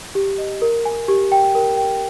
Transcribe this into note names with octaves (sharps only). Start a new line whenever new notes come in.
G4
D#5
A#4
G#5
G4
G5
A#4
G5